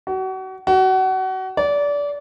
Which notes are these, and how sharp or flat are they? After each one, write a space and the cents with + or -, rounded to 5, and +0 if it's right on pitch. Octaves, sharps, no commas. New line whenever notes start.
F#4 +35
F#4 +30
D5 -25